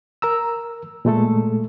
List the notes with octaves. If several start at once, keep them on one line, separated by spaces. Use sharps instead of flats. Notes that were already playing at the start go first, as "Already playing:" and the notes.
A#4 A#5 E6
A#2 G#3 A3 A4